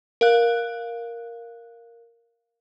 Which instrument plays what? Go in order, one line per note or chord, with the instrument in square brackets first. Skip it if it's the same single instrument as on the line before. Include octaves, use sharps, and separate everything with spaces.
[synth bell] A#4 F5 F#6